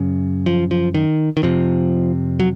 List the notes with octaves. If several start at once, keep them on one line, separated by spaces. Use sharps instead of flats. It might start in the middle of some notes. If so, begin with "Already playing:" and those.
Already playing: F#2 C#3
F3
F3
D#3
D#3
F2 C3 F3
F#3